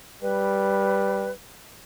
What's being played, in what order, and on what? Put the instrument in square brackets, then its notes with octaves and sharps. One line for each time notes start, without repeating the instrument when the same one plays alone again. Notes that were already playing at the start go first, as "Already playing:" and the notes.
[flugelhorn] G3 [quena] B4